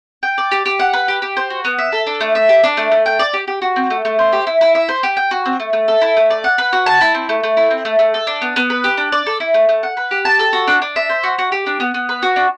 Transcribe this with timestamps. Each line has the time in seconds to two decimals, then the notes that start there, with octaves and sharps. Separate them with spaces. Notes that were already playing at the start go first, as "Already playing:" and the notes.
0.23 G5
0.38 D5
0.51 G4
0.65 G4
0.79 F#5
0.93 B4
1.08 G4
1.22 G4
1.37 C5
1.50 F#4
1.65 B3
1.78 E5
1.92 A4
2.07 D4
2.21 A3
2.35 E5
2.49 G4
2.64 D4
2.77 A3
2.92 A3
3.06 G5
3.19 D5
3.34 G4
3.48 G4
3.62 F#4
3.76 C4
3.90 A3
4.05 A3
4.19 C5
4.33 G4
4.47 E4
4.61 E4
4.75 E5
4.89 C5
5.03 G4
5.17 G5
5.31 F#4
5.46 C4
5.60 A3
5.73 A3
5.88 A4
6.02 E4
6.17 A3
6.30 D5
6.44 F#5
6.58 B4
6.73 F#4
6.86 A5
7.01 E4
7.14 C4
7.29 A3
7.44 A3
7.57 E4
7.71 C4
7.85 A3
7.99 A3
8.14 A4
8.27 D4
8.42 B3
8.56 B3
8.70 B4
8.84 G4
8.98 D4
9.12 D5
9.27 A4
9.40 E4
9.54 A3
9.69 A3
9.83 F#5
9.97 B4
10.11 G4
10.25 A5
10.39 A4
10.53 F#4
10.68 D4
10.82 D4
10.96 E5
11.10 C5
11.24 F#4
11.39 F#4
11.52 G4
11.67 D4
11.80 B3
11.94 B3
12.09 B4
12.23 F#4
12.36 D4